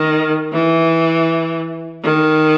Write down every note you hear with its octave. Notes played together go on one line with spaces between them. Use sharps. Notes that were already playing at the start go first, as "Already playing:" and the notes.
Already playing: D#3
E3
D#3